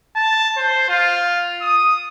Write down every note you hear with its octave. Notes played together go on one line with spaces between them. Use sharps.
A5
C5
F4
D#6